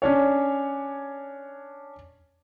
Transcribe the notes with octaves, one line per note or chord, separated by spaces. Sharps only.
C#4 D4 C#5